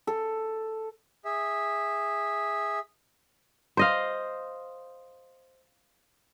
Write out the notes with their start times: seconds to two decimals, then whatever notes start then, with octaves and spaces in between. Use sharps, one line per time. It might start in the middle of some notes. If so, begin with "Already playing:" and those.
0.07 A4
1.25 G#4 E5
3.77 C5 D#5 F5